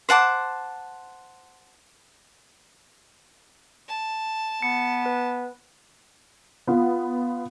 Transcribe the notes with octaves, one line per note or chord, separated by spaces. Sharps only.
C5 F#5 A5 D6
A5
B3 C#7
B4
B3 F4